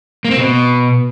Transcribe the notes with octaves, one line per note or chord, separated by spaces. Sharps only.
A#3
C4
B2